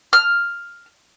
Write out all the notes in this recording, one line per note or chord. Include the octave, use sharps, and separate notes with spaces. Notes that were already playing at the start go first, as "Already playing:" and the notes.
F6